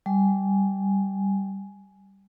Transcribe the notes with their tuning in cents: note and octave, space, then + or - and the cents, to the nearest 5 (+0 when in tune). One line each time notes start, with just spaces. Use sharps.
G3 -5 G#5 +10